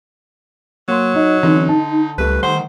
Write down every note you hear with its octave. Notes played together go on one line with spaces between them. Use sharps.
F#3 A#3 C6
D#4 D#5
D3 E3 C4 C#4 D#4
D#4 A5
C#2 G3 A3 B4
D#3 C5 F#5